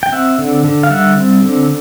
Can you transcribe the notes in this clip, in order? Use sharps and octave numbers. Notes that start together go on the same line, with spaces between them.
G5
C4 E5 F#5
D3
D3
F5
G3 E5 F#5
C4
D3